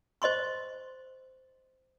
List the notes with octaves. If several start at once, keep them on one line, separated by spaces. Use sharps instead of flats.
C5 D#5 C6 C#6